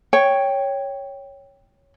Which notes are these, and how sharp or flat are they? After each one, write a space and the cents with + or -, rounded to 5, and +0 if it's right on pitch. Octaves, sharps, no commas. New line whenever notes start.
C#5 +0 G5 +0